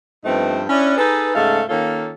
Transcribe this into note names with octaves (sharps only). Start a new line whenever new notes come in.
G2 F3 A3 B3 C4 D#4
C#4 D4 E4
D#4 G#4 A4 B4
G#2 C#3 G#3 A3 A4 F5
D#3 A#3 C#4 F4 A4